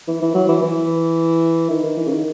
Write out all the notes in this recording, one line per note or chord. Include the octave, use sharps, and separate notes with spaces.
E3
E3
F#3
E3
E3
D#3
D#3
E3
C#3
D#3